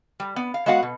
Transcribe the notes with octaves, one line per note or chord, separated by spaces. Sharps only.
G3
B3
F5
G#3 B3 F#4 F5 F#5
B2